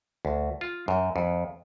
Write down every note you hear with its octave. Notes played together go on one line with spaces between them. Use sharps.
D2
F4
F#2
F2